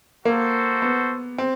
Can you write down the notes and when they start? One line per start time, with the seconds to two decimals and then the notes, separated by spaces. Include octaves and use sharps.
0.25 A#3 F#4 A4 C5
0.82 B3
1.38 C4